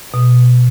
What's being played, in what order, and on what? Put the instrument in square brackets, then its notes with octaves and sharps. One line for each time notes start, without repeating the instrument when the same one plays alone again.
[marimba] B2